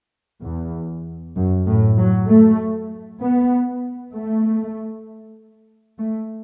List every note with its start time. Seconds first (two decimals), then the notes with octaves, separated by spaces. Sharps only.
0.43 E2
1.36 F#2
1.67 A2
1.98 F#3
2.28 A3
3.21 B3
4.14 A3
5.99 A3